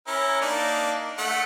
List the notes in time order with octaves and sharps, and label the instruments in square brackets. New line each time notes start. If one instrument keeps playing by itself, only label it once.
[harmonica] C#4 E4 A#4
A#3 D4 D#4
A3 F#5